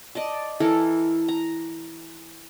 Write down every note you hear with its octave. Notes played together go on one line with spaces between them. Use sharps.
D5 D#5 A5
E3 A4 A#4
A#5